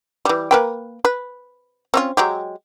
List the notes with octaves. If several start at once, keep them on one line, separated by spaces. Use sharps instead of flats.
E3 G3
A#3 B4 G5
B4
C4 C#4 F4
F#3 G#3 G4